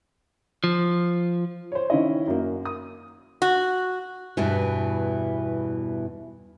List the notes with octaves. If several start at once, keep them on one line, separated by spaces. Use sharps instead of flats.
F3
C5 C#5
D#3 C#4 E4 D#5
F#2 A#3
D#6
F#4
E2 G2 B2 E3